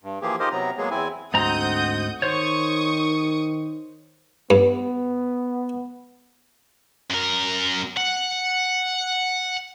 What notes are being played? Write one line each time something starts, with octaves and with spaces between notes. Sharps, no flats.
G2
E3 F3 A#3 G4 G#4
D#4 F4 G4 A#4 C5 D#5
C3 F#3 B3 A#5
F#3 G#3 A#3 B3 G#4
E2 C4 E4 G#5
D2 G#2 C4 F#5 A#5 D#6 G6
D#3 C5 C#5 C#6 D#6
G2 B3
F#2 A#4
F#5